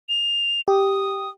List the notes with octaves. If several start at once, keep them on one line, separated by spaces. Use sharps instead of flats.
F7
G4 D#6